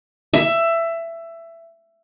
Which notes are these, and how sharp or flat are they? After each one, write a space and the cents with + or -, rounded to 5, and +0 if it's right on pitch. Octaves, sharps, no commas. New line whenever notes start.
E5 +15